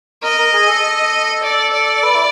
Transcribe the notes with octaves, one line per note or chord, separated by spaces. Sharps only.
A#4 D#5
A#4
G#4
A4
D5
D5
B4
E4